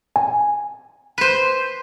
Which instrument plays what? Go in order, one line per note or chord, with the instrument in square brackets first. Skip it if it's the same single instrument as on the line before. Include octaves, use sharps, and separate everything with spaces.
[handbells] G#5
[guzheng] B4 C5